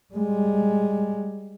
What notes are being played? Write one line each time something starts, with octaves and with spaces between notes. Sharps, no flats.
G3 G#3